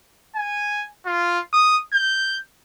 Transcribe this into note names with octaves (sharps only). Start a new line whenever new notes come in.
G#5
F4
D#6
G6